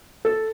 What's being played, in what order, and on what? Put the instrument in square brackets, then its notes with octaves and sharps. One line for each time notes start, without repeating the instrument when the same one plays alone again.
[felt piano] A4